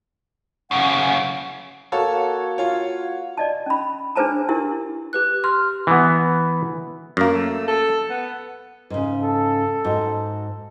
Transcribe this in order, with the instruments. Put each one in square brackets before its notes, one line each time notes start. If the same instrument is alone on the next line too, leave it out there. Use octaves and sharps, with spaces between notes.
[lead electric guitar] F#2 C#3 [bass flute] F#5
[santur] A#3 F#4 [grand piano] A4 C#5 A5
[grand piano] F4 C#5
[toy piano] D5 D#5 A5
C#4 B5
D4 G#4 B4 C5 A5 A#5
D4 E4 G4 A#4
[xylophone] G4 B4 F#6
[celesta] C6 [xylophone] F6
[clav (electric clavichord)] E3 B3
F#2 A#3
[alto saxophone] A3
A4
B3
[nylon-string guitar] G#2 C#3
[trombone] A4
[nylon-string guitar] G#2 F#4